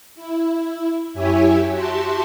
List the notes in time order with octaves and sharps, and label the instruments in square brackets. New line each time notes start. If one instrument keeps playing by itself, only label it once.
[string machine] E4
F#2 E4 G4 C#5 E5 G#5
F#4 G4 E5 A5 C6